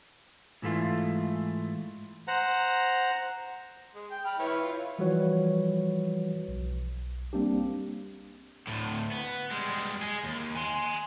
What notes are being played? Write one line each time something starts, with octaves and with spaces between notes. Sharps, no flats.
G#2 E3 A3 F4
C5 F#5 A#5
G#3
G5
B5 F6
E4 B4 C#5
F4
E3 F3 G3 F#4 B4 C#5
B1
G3 A#3 C4 D4 G4
D2 A2
B3
G3 G#3
G#4 D#5
D#2
G#5 C6